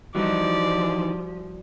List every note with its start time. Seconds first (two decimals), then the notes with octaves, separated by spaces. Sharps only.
0.15 E3 F3 G3 D#4 E4 F#4 D5